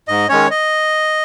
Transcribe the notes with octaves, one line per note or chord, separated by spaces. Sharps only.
G#2 D#5
D#3 G#3 C#4 C#5
D#5